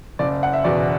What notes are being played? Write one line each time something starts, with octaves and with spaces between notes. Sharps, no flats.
F#1 D5
F#5
E5
E2 B2 D5